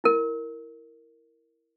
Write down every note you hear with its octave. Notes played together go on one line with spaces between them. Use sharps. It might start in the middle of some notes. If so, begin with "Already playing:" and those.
E4 A#4